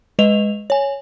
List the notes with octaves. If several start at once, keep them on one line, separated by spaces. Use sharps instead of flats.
G#3 B4 D#5 F7
C#5 G#5